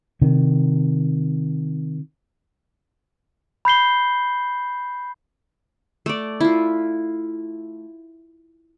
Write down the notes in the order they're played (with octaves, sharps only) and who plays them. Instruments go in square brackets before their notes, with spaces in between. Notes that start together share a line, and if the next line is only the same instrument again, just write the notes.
[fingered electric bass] C3 D#3
[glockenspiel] B5 G6 C7 G7
[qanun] A3 D5
E4 F4